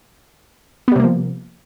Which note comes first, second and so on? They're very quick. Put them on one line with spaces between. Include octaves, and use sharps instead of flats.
B3 G3 C3 A#3 F3